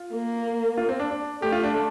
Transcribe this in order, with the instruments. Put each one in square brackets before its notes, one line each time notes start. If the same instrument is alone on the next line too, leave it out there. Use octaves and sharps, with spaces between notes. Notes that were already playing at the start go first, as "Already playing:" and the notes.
Already playing: [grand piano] F4
[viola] A#3
[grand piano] F4
C4
D4
D4
[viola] A3 [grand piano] G4
[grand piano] F4
D4
D4